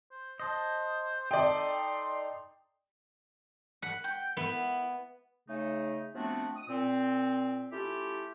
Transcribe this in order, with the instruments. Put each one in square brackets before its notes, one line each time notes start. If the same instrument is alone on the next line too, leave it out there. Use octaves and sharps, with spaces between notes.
[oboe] C5
[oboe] C5 [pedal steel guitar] D#5 A5
[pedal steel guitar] D#4 A4 D#5 [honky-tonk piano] D5 G5 [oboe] C6
[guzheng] F#5 [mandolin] B5
[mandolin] G5
[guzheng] B3 [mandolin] E4
[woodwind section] C#3 A3 D#4
F3 A3 B3 C4 D4 F#4
D#6
A#2 C4
A3 C#4 E4 F4 G4